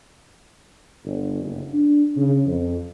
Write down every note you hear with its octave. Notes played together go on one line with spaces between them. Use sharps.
G1
F#1
D4
C#3
F2